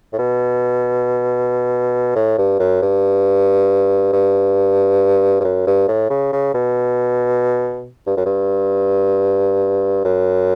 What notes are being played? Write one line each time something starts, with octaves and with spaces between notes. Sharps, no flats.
A2
B2
A2
G2
F#2
G2
G2
G2
F#2
G2
A2
C#3
C#3
B2
G2
F#2
G2
F#2